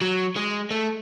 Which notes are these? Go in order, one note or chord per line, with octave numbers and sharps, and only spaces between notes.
F#3
G#3
A3